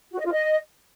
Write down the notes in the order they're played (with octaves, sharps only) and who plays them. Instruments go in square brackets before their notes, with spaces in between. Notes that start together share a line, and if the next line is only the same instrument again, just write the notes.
[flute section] F#4
D#5
F4
D#5